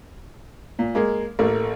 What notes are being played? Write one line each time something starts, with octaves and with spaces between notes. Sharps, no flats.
A#2
G#3 A#3
A1 A3 A#3